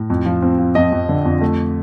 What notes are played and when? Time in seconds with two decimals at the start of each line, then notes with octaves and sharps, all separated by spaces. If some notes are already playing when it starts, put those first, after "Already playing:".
Already playing: A2
0.10 F2
0.25 F3
0.42 C4
0.59 F3
0.75 F2 D#5
0.92 F2
1.09 D3
1.25 F2
1.41 A3